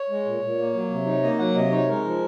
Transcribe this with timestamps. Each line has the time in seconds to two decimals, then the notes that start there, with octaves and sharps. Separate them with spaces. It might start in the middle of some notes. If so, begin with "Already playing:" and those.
Already playing: C#5
0.10 G#3
0.25 A#2
0.42 A#2
0.58 A#3
0.74 F#3
0.90 C3
1.06 D#4
1.23 A#3 D#5
1.39 F#3 F#5
1.55 C3 D#5
1.71 D#4 C#5
1.88 G#3 A#4
2.04 F3